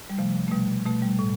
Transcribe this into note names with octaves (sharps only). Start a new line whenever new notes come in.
G3
C3 F3 A3
A3
B2 G3
B2 A3
G3
A2